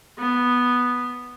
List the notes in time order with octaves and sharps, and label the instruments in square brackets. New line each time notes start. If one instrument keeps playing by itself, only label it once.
[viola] B3